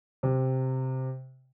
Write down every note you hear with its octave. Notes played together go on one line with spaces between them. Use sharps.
C3